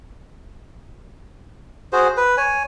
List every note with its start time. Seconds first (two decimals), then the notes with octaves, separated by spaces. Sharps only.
1.93 F#4 G#4 C5
2.17 B4
2.37 C#5 G#5